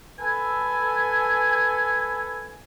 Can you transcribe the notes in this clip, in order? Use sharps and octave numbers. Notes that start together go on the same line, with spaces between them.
A4 B4 G#5